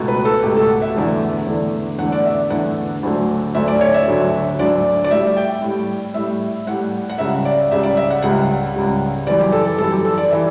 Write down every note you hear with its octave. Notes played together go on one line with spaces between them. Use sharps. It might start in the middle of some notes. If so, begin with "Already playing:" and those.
Already playing: C#2 B2 A3
B4
A4
C#2 B2 A3 G4
A4
F#5
E5
E2 D3 A3
E2 D3 A3
E2 D3 A3 F#5
D5
E5
E2 D3 A3 F#5
D2 D3 F#3 A3
D2 D3 F#3 A3 E5
D5
C#5
E5
D2 D3 F#3 A3
D2 D3 F#3 A3 D5
D5
A2 G3 E5
G5
A2 G3
A2 G3 E5
A2 G3 F#5
F#5
C#2 C#3 G3 E5
D5
C#2 C#3 G3 E5
D5
E5
F#5
C#2 C#3 G3 F#5
C#2 C#3 G3
F#2 E3 G3 D5
G4
A4
A4
F#2 E3 G3 A4
G4
A4
D5
E3 G3 E5